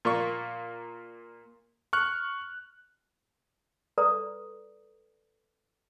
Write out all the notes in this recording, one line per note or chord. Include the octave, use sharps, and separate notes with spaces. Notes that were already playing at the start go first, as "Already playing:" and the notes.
A#2 A#3 D5 C#6
C#6 F6 F#6
A4 B4 D5 A#5 D#6